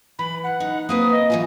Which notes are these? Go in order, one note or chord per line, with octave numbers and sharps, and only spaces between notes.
E3 B5
F#5
D#4
A#3 C4 B4 D#6
D#5
E3 A3 F4 G#5